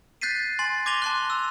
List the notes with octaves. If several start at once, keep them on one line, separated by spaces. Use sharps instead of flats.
F#6 G6 A6 B6 C7 D#7
G#5 C6 A6 F#7
D6 G#6 A#6 D#7 F7 G7
A5 C6 F#6
E6